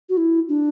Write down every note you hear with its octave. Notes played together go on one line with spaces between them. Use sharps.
F#4
E4
D4